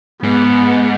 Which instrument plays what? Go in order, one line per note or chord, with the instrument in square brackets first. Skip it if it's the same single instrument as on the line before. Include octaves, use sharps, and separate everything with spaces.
[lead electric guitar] G#2 [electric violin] B3